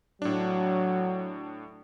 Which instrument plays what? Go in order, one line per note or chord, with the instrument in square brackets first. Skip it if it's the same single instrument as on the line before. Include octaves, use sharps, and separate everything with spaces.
[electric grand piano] A2 D4 [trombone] F#3